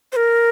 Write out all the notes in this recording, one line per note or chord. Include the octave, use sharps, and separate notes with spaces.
C5
A#4